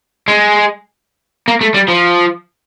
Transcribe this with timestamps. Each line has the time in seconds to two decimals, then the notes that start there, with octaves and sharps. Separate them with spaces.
0.28 G#3
1.48 A#3
1.61 A3
1.74 G3
1.88 F3